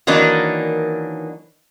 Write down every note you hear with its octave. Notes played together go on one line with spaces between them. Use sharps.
D#3 E3 F#3 A#3 D4 D#4